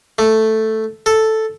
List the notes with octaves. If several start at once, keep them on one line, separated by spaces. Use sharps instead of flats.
A3
A4